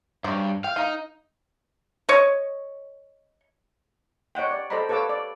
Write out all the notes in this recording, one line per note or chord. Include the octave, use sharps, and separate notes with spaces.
G2 F#3 C5 D5
F5 G5
D#4 A#4 F5
C#5 D#5
C#5 D#5 F#5 G5
D5
A4 C5 D5 D#5 A#5 B5
A4 B4 C#5 F5 D6 E6
D5